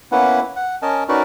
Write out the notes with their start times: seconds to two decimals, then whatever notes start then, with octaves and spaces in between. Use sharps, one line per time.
0.12 A#3 B3 C#4 E4 B4 F#5
0.56 F#5
0.82 C#4 A#4 D#5 G#5 A5
1.08 C#4 D#4 F#4 A#4 B4 D5